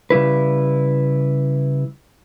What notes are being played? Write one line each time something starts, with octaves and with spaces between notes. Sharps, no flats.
C#3 G3 E4 B4